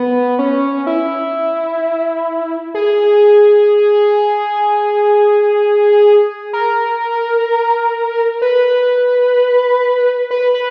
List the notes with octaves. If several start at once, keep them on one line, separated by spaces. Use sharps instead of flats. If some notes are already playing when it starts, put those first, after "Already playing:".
Already playing: B3
C#4
E4
G#4
A#4
B4
B4
B4